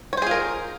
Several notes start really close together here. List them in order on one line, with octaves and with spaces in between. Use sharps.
C#5 C5 G#4 F4 A#4